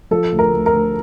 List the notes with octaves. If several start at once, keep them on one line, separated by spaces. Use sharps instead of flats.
F3 A4
D2
A#4
D2
A#4
D2